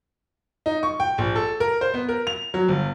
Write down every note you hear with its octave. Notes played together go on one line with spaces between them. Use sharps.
D#4
C#6
G5
A#1
A4
A#4
C5
B3
A#4
F7
F#3
G1